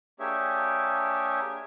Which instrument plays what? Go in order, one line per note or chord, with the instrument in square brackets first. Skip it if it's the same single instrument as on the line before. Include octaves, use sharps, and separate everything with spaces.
[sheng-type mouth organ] A#3 D4 G4 G#4 C#5 E5